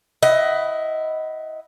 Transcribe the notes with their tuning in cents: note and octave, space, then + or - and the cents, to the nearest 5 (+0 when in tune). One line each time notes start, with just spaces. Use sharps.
E4 +0 D#5 +15 F#5 +20